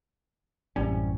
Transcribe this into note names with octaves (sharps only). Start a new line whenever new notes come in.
A1 F#2 C3 G3 C#4